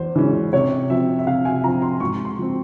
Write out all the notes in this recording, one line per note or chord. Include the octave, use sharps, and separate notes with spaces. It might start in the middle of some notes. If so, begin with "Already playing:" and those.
Already playing: E2 C5
E3 G#3 C#4
C3 C#5
F3 C4 E5
E5
C3 F5
G#5
F3 C4 A#5
C6
G#2 C#6
C6
F3 C4